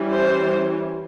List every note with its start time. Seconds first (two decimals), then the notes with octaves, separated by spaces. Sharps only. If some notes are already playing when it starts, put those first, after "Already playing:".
Already playing: E3 G3 C#4
0.11 C5